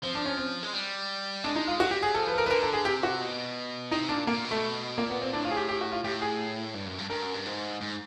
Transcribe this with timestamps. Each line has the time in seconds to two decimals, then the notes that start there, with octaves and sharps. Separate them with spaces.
0.03 F3 C4
0.15 D4
0.26 C#4
0.37 C4
0.63 G#3
0.73 G3
1.44 G#3 D4
1.56 D#4
1.67 F4
1.80 F#3 F#4
1.91 G4
2.03 G#4
2.15 F3 A4
2.27 B4
2.34 A4
2.38 A#4
2.46 C#3 B4
2.50 D3 A#4
2.63 A4
2.73 G#4
2.85 C3 G4
3.03 F#4
3.21 B2
3.91 C3 D#4
4.09 A#2 D4
4.27 A#2 A#3
4.45 B2
4.51 A3
4.98 A#2 A#3
5.10 B3
5.22 C4
5.33 A2 D4
5.45 F4
5.51 G#4
5.57 G4
5.69 G4
5.81 F#4
5.92 F4
6.04 A2 G4
6.22 G#4
6.75 G2
6.87 F#2
6.98 G2
7.10 G2 A#4
7.22 F#2
7.34 G2
7.46 G#2
7.81 G#2